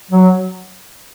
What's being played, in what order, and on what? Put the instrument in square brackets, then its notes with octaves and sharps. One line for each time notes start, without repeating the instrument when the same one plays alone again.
[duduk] F#3